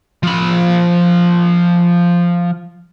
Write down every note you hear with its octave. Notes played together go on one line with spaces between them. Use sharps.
F3 B5